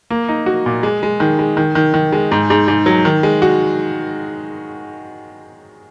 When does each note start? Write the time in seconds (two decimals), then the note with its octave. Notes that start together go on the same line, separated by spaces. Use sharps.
0.10 A#3
0.28 D#4
0.46 F#4
0.66 A#2
0.83 G#3
1.03 G#3
1.20 D#3
1.39 G#3
1.57 D#3
1.75 D#3
1.94 D#3
2.12 G#3
2.32 G#2
2.50 G#2
2.68 G#2
2.86 F#3
3.05 D#3
3.23 G#3
3.42 F#4